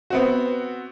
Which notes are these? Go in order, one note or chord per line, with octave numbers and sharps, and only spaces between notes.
B3 C4 F#4